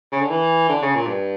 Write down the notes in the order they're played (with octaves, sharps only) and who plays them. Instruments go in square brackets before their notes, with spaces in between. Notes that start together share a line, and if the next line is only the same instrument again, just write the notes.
[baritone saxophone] C#3
D3
E3
D3
C#3
A#2
G2